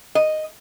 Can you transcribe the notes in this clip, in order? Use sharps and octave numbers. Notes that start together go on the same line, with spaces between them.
D#5